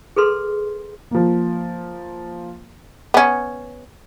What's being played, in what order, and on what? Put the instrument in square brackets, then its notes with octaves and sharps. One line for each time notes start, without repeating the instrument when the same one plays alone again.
[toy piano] G#4 A4 B4 C6
[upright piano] F3 A#3
[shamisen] B3 C#4